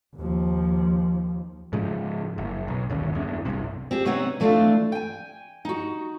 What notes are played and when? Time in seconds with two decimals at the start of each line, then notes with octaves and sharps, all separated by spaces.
0.16 D#2 F3
1.73 G#2 C#3 F3
2.38 F#1
2.68 B1
2.90 G1 D#2 C#3
3.15 E2 G2
3.45 F#1 C2 G2 C3
3.91 C4 G4 G#4
4.05 C3 B3 C4 D#4 C#5 F#5
4.40 E3 A3 C4 D4 F4
4.92 G5 G#5
5.65 D#4 F#4